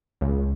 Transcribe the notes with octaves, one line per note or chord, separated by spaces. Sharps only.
C#2